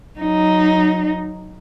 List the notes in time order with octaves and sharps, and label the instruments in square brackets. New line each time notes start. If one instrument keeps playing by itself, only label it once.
[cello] F#3 D#4